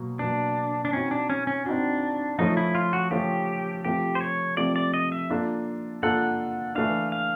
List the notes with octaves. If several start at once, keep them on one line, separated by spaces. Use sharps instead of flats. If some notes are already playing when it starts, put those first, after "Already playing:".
Already playing: B2 F#3 A#3
B2 F#3 A#3 D4
D4
C4 C#4 D#4 F#4
D4
C#4
C#4
C4 D4 D#4 F#4
F3 A3 C#4 D#4 F4
E4
F4
F#4
F3 A3 C#4 F4 G4
C3 F3 A3 C4 F4 G4
C5
C#5
C3 F3 A3 C4 F4 D5
D5
D#5
E5
A#3 D4 F4 A4
A#3 D4 F4 A4 F#5
E3 A3 D4 F5
F5